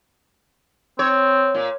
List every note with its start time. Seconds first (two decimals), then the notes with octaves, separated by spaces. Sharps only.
0.99 C4 C#5
1.55 A#2